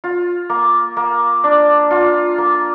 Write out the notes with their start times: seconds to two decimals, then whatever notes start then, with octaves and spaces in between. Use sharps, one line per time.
0.04 F4
0.50 A#3
0.97 A#3
1.44 D4
1.91 F4
2.38 A#3